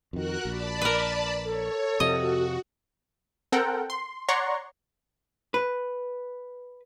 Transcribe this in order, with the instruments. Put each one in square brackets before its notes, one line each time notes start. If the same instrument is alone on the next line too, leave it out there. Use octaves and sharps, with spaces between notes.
[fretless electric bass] F2 D#3 [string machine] F#4 A#4 F#6
[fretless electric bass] A#1 [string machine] D5 A5 B5
[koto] A#4 B4
[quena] A4 [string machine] C#5
[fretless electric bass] F2 C3 F3 [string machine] F#4 [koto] D#5
[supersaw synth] C4 A4 A#4 F#5 G5
C6
C#5 D5 F#5 A#5 C6 C#6
[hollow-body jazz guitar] B4